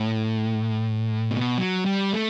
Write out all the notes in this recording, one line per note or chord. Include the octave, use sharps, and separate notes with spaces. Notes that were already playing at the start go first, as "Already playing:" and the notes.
Already playing: A2
B2
F#3
G3
A3